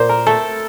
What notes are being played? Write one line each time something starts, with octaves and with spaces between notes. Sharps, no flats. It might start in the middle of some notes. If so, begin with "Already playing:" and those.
Already playing: A#2 C5
A#4
A3 A4